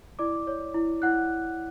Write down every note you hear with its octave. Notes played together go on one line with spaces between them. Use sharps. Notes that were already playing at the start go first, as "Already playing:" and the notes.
E4 D5 D6
C#5
E4
E4 F#5 F#6